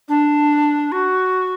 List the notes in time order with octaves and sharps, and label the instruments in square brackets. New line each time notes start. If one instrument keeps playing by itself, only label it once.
[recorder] D4
F#4